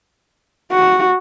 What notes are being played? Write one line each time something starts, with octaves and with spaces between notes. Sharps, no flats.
F#4